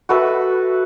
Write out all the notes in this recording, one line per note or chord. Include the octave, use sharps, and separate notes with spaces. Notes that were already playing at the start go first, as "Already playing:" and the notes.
F#4 A4 B4 E5